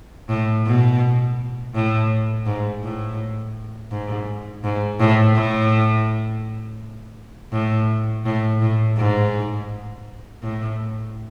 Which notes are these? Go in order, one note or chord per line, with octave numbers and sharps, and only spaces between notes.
A2
B2
A2
G#2
A2
G#2
G#2
A2
A2
A2
A2
A2
G#2
A2